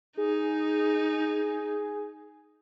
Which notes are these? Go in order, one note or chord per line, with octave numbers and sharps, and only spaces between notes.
D#4 G#4